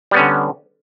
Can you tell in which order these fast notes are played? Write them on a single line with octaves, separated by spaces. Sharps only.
G3 B3 C#4 D3